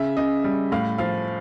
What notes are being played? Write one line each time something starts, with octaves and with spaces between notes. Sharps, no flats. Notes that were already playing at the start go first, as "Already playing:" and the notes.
Already playing: C#3 E5
C#3 D#5
G3
A2 F5
F3 F5